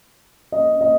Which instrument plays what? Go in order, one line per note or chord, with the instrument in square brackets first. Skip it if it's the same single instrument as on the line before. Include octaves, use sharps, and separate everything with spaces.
[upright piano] D#5
D#5